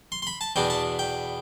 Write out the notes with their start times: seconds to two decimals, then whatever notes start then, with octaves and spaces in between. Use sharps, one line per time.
0.12 C6
0.22 C6
0.27 B5
0.41 A5
0.56 E2 B2 B3 D4 G5
0.70 A5
0.99 G5